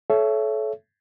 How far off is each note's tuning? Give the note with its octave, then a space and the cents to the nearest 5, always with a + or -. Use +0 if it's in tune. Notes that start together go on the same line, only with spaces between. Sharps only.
A4 -25 C#5 +10 E5 +20